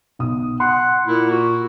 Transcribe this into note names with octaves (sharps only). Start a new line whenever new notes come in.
B1 D#6
F#5 C6
A#2 E4
F#4